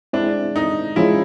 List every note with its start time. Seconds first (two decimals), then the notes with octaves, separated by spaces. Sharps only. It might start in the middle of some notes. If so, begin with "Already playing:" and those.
0.13 G#3 C4 D4 E4
0.56 D#4
0.96 F3 G#3 C#4 E4 F4